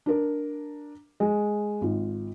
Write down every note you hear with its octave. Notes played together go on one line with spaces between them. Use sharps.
D4 A#4
G#3
G#1 F4